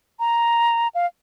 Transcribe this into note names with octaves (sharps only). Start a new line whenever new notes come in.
A#5
F5